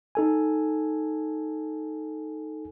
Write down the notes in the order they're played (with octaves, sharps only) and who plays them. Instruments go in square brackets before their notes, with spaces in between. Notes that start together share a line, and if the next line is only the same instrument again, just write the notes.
[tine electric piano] D#4 A4 G#5